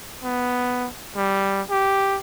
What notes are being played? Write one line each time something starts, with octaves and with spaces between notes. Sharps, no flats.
B3
G3
G4